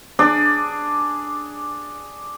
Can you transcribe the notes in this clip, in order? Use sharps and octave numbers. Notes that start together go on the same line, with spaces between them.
D4 G#4 D5